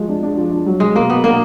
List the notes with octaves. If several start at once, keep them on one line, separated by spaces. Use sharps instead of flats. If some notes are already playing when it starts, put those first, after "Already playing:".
Already playing: F3 G#3 F#4
D4
D4
F3
D4
F#3
F#3 G#3
B2 A#3
B2 B3
A#3 D4